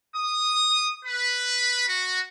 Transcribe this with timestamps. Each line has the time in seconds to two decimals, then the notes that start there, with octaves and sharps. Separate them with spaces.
0.15 D#6
1.04 B4
1.88 F#4